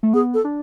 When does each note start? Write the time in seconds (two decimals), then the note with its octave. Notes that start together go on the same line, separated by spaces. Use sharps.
0.03 A3
0.13 B3 G#4
0.34 A4
0.44 D4